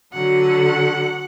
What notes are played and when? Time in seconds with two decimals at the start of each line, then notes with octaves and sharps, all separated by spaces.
0.13 D3 F#3 F#5